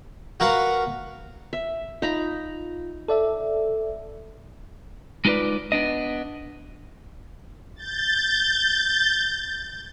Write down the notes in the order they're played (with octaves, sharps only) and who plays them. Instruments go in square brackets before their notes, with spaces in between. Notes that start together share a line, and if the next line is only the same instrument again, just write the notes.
[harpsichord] F#4 A#4 B4 F5 F#5
[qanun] E5
[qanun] D#4 A#5 B5 [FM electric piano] F4
[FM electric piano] A4 D5 E5
[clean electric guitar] G#3 D#4 F4 A#4 B4 D5
B3 D4 D#5
[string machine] G6 A6